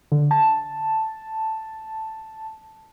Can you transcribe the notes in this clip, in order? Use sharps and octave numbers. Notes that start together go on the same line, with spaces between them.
D3
A5